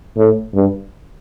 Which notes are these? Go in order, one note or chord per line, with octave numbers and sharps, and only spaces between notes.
A2
G2